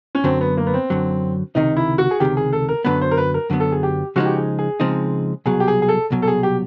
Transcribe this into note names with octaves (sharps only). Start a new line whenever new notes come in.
C#4
F#2 D3 F#3 C4
B3
A#3
B3
C4
F#2 D3 F#3
C#2 C3 D#3 D#4
E4
F#4
G#4
C#2 C3 D#3 G4
G#4
A4
A#4
F#2 D3 F#3 B3 B4
C5
A#4
B4
A#4
F#2 D3 F#3 B3
A4
G#4
G4
C#3 F3 G#3 C4 D#4 F#4
G4
G#4
G#4
C#3 F3 G#3 C4 D#4
C2 B2 F#3 G#4
G4
G#4
G#4
A4
C2 B2 F#3
A4
G#4
G4